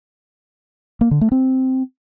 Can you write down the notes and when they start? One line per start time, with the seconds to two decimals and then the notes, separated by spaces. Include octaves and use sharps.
1.01 A#3
1.11 D3
1.21 A3
1.32 C4